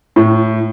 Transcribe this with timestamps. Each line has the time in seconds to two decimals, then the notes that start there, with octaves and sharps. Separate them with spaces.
0.16 A2